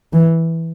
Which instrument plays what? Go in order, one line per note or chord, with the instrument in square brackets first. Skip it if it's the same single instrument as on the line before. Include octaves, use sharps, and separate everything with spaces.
[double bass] E3